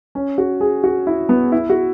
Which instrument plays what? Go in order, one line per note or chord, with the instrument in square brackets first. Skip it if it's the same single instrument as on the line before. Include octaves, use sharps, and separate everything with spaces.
[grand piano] C#4
F#4
G#4
F#4
E4
B3
E4
F#4